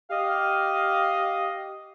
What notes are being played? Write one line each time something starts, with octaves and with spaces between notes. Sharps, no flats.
G4 D#5 F5